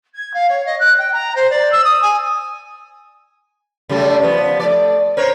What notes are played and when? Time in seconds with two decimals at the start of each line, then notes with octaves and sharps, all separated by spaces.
0.14 G#6
0.33 F5
0.49 C#5
0.65 D#5
0.79 F#6
0.98 G5
1.13 A#5
1.35 C5
1.49 D5
1.71 E6
1.84 D#6
2.02 G#5
3.89 C#3 G3 A3
4.22 F3 B3
4.60 A3 D5
5.17 A#4 C5 C#5